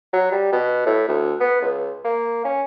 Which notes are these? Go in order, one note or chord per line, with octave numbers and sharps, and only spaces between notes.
F#3
G3
B2
A2
D2
B3
C#2
A#3
C#4